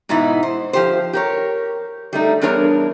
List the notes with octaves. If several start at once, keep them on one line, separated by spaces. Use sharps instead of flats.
G#2 B2 E3 D#4 E4
C5
F3 G4 C5
G4 A#4 C#5
G3 A3 D#4
E2 G3 D4 G#4 A#4 C#5